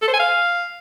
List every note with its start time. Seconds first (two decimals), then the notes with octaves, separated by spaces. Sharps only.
0.02 A4
0.08 C5
0.13 G#5
0.19 F5